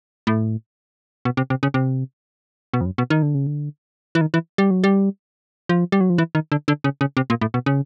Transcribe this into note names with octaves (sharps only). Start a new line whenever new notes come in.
A2
B2
C3
C3
C#3
C3
B2
F2
F#2
B2
D#3
D3
C#3
D3
E3
D#3
E3
G3
F#3
G3
F3
G3
F#3
F3
E3
D#3
D3
D3
C#3
C#3
C3
A#2
A2
B2
C#3